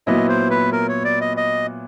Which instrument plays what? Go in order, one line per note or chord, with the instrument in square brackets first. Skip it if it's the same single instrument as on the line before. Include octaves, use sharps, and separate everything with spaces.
[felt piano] A#2 F#3 B3 E4 [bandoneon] D#5
[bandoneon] C5
B4
A#4
C#5
D5
D#5
D#5